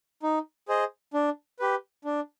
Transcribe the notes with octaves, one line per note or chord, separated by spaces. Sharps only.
D#4
G#4 C5 D#5
D4
G4 B4
D4